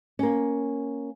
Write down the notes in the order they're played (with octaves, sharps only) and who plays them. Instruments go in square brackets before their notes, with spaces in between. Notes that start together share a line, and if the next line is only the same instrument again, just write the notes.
[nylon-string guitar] A#3 C#4